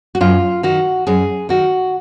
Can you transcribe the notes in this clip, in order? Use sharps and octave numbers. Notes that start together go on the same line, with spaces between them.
F#4
F#2 F4
D#3 F#4
F#2 G#4
D#3 F#4